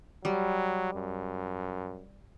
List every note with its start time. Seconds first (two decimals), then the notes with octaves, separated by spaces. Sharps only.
0.25 F#3 G3
0.93 F#2